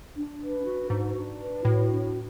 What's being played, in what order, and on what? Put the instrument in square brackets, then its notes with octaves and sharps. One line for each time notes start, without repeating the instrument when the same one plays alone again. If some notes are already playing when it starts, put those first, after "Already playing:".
[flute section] D4
B4
F#4
[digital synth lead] G#2 [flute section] D4
[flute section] D4
B4
[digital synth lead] A2 [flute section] F#4
[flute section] D4